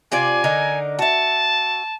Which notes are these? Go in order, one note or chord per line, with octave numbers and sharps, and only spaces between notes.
C3 F4 D5 G#5
D3 D#4 A#4
F#4 E5 A5